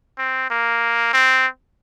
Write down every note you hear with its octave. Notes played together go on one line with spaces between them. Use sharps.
C4
A#3
C4